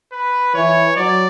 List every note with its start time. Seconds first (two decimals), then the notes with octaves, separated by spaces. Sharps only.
0.12 B4
0.54 E3 C#5
0.96 F#3 D5